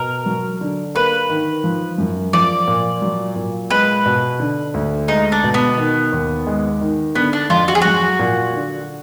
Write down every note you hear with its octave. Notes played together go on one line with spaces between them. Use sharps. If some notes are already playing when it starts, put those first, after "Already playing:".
Already playing: B2 A#4
F#3
D3
A#3 B4
D#3
F3
F#2
F3 D5
A#2
F#3
A#2
G#3 B4
B2
D3
D2
G#3 D#4
D4
B2
B3
D#3
D#2
G#3
D#3
D3 B3
D4
F2 F4
F#4
G#4
F#3 F#4
A#2
D3